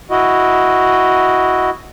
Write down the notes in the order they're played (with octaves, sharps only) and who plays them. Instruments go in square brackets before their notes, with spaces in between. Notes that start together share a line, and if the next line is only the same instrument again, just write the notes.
[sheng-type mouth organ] E4 F#4 D#5